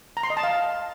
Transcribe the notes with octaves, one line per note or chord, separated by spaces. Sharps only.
A#5
C6
D#5
A5
F5